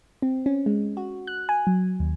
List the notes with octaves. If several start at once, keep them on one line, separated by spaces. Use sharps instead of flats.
C4
C#4
G#3
F#4
F#6
G#5
F#3
D#2